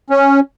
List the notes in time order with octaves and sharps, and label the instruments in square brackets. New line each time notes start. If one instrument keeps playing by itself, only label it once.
[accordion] C#4